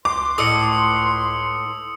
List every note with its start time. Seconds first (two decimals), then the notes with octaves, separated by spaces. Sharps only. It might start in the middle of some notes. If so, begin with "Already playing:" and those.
0.05 C#2 B4 C6 D6
0.38 A2 D#5 D#6 E6 C#7